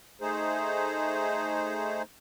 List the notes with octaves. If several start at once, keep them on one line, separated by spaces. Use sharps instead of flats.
A3 D#4 G#4 C5